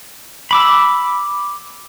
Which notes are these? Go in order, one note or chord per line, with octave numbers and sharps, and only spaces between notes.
B5 D6 E6